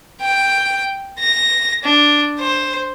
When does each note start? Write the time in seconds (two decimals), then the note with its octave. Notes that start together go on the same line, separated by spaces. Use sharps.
0.21 G5
1.20 A#6
1.84 D4
2.40 C5